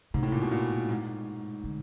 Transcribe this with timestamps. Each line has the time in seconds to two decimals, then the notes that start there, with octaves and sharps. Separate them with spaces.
0.14 G#2 C3
0.23 A2
0.32 A#2
0.42 B2
0.51 A#2
0.89 G#2
1.64 D3